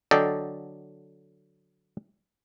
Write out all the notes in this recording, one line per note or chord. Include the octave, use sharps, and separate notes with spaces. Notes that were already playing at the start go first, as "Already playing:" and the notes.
D3 F#3 A4 D5 D#5 G5